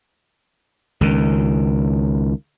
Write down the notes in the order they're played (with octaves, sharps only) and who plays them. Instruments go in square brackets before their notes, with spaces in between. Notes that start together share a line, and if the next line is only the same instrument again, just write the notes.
[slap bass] C#2 D#3